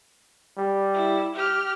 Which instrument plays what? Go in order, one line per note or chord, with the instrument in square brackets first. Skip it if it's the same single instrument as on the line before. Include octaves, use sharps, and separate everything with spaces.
[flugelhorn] G3
[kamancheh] E4
G4 F6